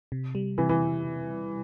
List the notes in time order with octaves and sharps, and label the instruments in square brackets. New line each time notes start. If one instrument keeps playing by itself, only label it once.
[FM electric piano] C3
G3
[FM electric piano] C3 [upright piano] E3
[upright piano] E3